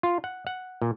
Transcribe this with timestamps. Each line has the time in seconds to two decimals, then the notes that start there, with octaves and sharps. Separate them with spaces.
0.03 F4
0.24 F#5
0.47 F#5
0.82 A#2